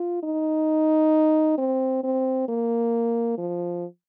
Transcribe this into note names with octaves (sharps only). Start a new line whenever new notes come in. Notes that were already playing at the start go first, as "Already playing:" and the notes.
Already playing: F4
D#4
C4
C4
A#3
F3